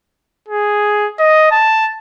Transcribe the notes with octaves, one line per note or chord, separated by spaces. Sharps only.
G#4
D#5
A5